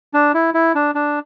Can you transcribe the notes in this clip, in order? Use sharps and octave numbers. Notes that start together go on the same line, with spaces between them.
D4
E4
E4
D4
D4